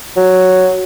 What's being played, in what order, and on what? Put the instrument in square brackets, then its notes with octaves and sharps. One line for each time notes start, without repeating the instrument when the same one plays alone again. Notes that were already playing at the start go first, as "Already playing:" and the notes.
[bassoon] F#3